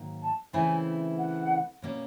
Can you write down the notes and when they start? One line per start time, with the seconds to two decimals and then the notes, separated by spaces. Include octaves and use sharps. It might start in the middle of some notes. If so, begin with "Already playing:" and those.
Already playing: G#2 D#3 F#3 A#3
0.22 A5
0.53 C#3 E3 A3 C4 E4 G#5
1.18 F#5
1.82 B2 G3 A#3 C#4